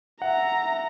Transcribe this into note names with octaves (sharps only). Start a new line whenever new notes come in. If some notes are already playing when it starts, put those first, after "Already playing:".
E5 F#5 A#5